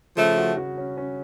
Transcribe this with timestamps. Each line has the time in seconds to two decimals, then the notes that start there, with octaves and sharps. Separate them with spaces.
0.17 C#3 F3 A3
0.38 F#4
0.57 F#4
0.77 C#4
0.97 C#4